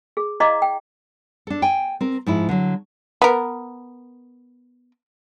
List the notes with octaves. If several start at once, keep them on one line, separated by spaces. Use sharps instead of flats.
G#4
E4 D5 D#5 F5 A#5 D6
G5
D4 A4
G5 G#5
C4 A#4
G#2 F3 E4
D3 F#3
B3 A#4